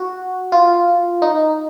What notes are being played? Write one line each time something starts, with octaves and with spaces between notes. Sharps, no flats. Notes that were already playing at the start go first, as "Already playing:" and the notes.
Already playing: F#4
F4
D#4